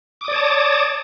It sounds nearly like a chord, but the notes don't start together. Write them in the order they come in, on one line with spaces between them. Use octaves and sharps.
D6 D#6 D5 C#5 A5